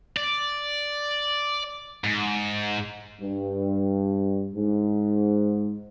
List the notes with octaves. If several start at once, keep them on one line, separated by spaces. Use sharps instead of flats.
D5
G#2
G2
G#2